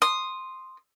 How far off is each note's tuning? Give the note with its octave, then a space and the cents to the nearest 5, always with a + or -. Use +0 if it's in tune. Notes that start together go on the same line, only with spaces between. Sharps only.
C6 +0 D#6 -10